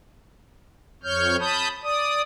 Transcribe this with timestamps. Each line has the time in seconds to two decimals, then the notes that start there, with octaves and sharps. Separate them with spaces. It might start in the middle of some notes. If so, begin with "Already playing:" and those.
1.03 F2 C#5 F6 G6
1.39 A5 B5 D#6 G6
1.83 D5 D#6